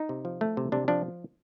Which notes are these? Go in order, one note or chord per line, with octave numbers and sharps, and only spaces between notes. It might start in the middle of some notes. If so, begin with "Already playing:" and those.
Already playing: D#4
C3
F3
A3
C3
C3 D4
F3 D4